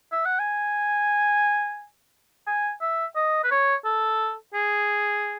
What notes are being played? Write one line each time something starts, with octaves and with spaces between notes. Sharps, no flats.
E5
F#5
G#5
G#5
E5
D#5
B4
C#5
A4
G#4